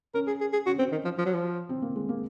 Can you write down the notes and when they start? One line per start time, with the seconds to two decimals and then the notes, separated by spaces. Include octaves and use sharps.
0.14 C#4 A#4
0.27 G#4
0.41 G#4
0.53 G#4
0.66 C#4 F#4
0.79 C4
0.92 D#3
1.05 F3
1.18 F3
1.26 F#3
1.34 F3
1.69 C4
1.82 A#3
1.96 G#3
2.09 A#3